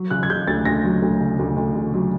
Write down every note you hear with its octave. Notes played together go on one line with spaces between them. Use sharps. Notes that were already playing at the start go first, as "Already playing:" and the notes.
Already playing: F#3
C#3 F#6
G#6
C#3 G6
D2 A6
D2 A#6
F#3
D2
C#3
D2
D2
C#3
F#3